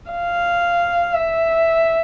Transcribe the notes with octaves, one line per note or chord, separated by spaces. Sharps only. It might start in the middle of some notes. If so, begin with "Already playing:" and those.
F5
E5